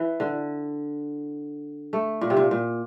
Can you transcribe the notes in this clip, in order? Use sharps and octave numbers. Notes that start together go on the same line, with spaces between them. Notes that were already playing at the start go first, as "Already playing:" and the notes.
Already playing: E3
D3
A3
A#2
C3
A#2
A#2